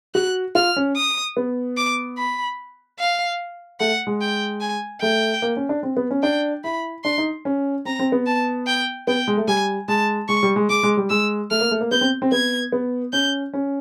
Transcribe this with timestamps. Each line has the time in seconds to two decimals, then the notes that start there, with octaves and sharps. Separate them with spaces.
0.15 F#4 F#6
0.55 F4 F6
0.76 C#4
0.96 D#6
1.37 B3
1.77 D6
2.18 B5
2.99 F5
3.80 A3 F#5
4.07 G#3
4.21 G5
4.61 G#5
5.01 A3 G5
5.42 A#3
5.57 C#4
5.69 D4
5.83 C4
5.97 B3
6.11 C#4
6.23 D4 G5
6.64 E4 B5
7.04 D4 C6
7.18 D#4
7.45 C#4
7.85 C4 A#5
7.99 C4
8.12 B3
8.27 A5
8.67 G5
9.07 B3 G5
9.28 G#3
9.37 A3
9.48 G3 G#5
9.88 G#3 A5
10.29 G#3 C#6
10.43 G3
10.56 G#3
10.69 G#3 D6
10.83 G#3
10.97 G3
11.10 G#3 E6
11.51 A3 F6
11.61 A#3
11.71 A3
11.81 A#3
11.91 B3 G6
12.01 C4
12.22 C4
12.32 B3 G#6
12.72 B3
13.13 C#4 G6
13.53 C#4